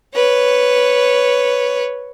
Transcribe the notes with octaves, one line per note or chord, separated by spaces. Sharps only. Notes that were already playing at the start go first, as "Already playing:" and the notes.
B4 C#5